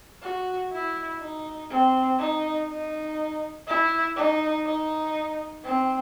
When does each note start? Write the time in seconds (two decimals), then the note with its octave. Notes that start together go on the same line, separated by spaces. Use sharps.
0.22 F#4
0.72 E4
1.21 D#4
1.70 C4
2.19 D#4
2.69 D#4
3.67 E4
4.16 D#4
4.66 D#4
5.64 C4